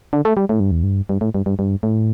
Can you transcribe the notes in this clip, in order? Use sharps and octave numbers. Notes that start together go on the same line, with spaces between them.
D3
A3
G3
A2
G2
E2
G2
G2
A2
G2
G2
G2
A2